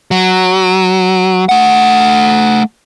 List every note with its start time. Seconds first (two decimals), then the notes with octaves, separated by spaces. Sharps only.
0.11 F#3
1.49 A3 F#5